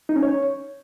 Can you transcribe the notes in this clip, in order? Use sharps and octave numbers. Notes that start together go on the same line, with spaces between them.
D#4
C#4
C#5